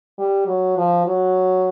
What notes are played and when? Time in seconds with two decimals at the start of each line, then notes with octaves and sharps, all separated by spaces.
0.19 G3
0.47 F#3
0.77 F3
1.07 F#3